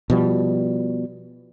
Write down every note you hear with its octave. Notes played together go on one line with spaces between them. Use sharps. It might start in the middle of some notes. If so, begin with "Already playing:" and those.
B2 F3 G3